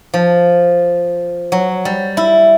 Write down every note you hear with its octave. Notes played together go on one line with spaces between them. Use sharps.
F3
F#3
G3
E4